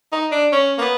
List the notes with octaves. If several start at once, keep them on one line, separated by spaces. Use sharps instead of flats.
D#4
D4
C#4
A#3
B3